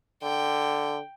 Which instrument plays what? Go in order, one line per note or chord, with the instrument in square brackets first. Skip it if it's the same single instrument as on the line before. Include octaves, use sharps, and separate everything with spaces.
[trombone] D3 [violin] G5